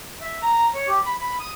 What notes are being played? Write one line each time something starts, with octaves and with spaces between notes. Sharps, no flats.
E5
A#5
A#5
C#5
G4
B5
B5
D#6